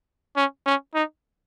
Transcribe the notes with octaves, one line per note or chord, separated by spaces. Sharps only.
C#4
C#4
D#4